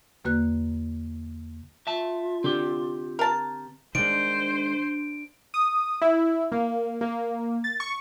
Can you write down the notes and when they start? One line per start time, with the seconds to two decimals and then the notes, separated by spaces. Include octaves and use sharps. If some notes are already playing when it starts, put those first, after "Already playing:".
0.24 E2 D3 A#3 F#4 B4 F#6
1.87 F4 E5 A5
2.44 D3 C4 G4
3.19 A#4 A5
3.95 D#3 G#3 D4 C5 D7
5.54 D#6
6.02 E4
6.52 A#3
7.01 A#3
7.64 A6
7.80 C#6